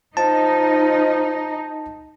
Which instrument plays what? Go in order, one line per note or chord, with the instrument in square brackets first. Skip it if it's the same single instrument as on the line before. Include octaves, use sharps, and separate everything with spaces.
[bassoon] F3 [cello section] D#4 [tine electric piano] A5